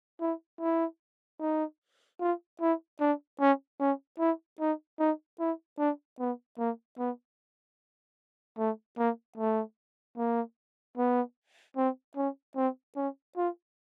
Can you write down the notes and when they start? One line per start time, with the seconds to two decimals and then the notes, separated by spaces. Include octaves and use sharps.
0.21 E4
0.61 E4
1.40 D#4
2.21 F4
2.61 E4
3.00 D4
3.40 C#4
3.80 C#4
4.19 E4
4.60 D#4
4.99 D#4
5.39 E4
5.79 D4
6.19 B3
6.58 A#3
6.98 B3
8.58 A3
8.98 A#3
9.38 A3
10.17 A#3
10.98 B3
11.77 C4
12.16 C#4
12.56 C4
12.96 C#4
13.37 F4